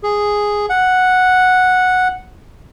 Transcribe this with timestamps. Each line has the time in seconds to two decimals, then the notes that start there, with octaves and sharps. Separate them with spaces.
0.03 G#4
0.69 F#5